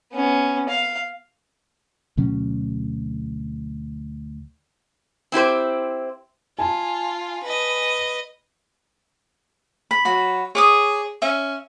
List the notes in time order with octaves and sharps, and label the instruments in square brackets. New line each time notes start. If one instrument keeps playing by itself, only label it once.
[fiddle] B3 C#4
F5
[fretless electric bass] D2 B2 F#3 C#4
[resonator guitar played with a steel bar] C4 E4 G4 C5
[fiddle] F4 [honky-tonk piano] G#5 A5
[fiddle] B4 D#5
[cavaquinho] B5
[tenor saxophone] F#3 [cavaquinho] F#4 B5
[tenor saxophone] G#4 [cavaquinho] C#5 D6 D#6
[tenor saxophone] C#4 [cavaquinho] E5